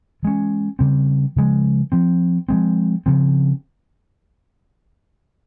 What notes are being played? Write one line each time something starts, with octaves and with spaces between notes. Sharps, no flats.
E3 G#3 C#4
C#3 G3 C4
C#3 F3 G#3
F3 C4
F3 G#3 C4
C#3 F3 C4